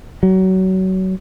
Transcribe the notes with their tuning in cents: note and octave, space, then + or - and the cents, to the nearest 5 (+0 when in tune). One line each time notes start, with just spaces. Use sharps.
F#3 +25